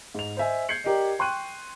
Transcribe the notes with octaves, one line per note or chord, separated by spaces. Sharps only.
G#2 F7
C5 D#5 E5 G#5
G6 G#6 C7 C#7 F#7
G4 A#4 D5 D#5
G5 C6 C#6 F#6 D#7